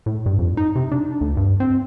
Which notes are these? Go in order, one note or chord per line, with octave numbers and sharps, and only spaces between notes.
A2
G2
F2
D#4
C3
D4
D2
G2
C4